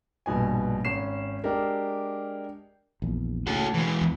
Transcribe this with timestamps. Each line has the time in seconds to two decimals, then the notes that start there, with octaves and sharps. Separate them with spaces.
0.26 A#1 G2 B2 G#5
0.85 G#1 C#4 C7 E7
1.44 G#3 D4 G4 A#4
3.02 A#1 E2
3.47 A2 C#3 F#4 A4
3.74 E3 G#3
4.01 E2